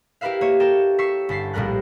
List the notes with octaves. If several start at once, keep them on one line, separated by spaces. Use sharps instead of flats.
E4 G4 A#4 B4 E5 F5
A#3 C#5 E5
A4 A#4 G5 E7
C#6 E6 B6 C7
G1 A5 B6 C7
A#1 A2 G3 A#4 F#6